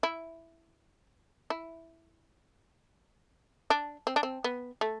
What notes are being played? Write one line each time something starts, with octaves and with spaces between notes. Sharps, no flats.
E4
E4
D4
C4
D4
C4
B3
A3